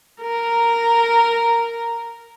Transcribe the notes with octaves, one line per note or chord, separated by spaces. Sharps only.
A#4 A#5